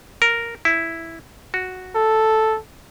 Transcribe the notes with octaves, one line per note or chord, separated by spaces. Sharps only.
A#4
E4
F#4
A4